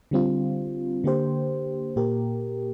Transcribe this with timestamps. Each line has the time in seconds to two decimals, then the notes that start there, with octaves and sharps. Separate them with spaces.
0.11 D3 G3 C4 F4
1.04 D3 A#3 G4 C5
1.96 A#2 A#3 G4 A#4